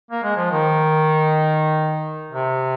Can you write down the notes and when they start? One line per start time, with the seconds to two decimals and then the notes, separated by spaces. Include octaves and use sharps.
0.11 A#3
0.23 G#3
0.37 F3
0.51 D#3
2.32 C3